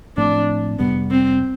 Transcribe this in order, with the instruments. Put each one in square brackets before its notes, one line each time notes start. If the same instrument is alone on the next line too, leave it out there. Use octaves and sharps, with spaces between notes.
[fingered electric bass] A2 F3 A3 C4 [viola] D4
[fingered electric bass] F2 C3 G3 [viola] B3
[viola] C4